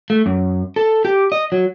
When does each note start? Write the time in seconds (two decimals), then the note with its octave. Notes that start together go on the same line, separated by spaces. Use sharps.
0.10 A3
0.26 F#2
0.76 A4
1.05 G4
1.32 D#5
1.52 F#3